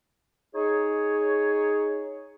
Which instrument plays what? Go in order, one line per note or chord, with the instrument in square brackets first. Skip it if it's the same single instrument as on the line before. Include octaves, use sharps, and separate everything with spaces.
[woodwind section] D#4 G#4 C#5